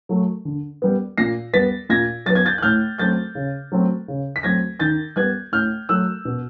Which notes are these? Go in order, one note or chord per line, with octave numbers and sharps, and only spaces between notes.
F#3 A3
D3
G3 B3
A#2 A#6 C7
G3 B3 A6 B6
A#2 G#6 A#6
F#3 B3 A6
G#6
G6 A6
F#6
A2 F6 G6
F#3 A3 C4 G6 A6
C#3
F#3 A3 C4
C#3
B6
F#3 A3 C4 G#6 A#6
D#3 G6 A6
G3 B3 F#6 G#6
A2 F6 G6
F#3 A3 E6 F#6
B2